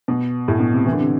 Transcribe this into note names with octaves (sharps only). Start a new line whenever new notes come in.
B2
A2
B2
C3
E3
D3
C3